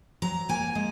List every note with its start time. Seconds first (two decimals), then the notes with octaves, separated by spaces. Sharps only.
0.22 F#3 A#5
0.49 A#3 G#5
0.75 G#3